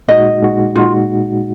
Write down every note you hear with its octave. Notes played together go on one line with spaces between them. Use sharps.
A#2 G#3 D#4 F#4 D#5
A#2 G#3 D#4 F#4
A#2 G#3 D#4 F4 F#4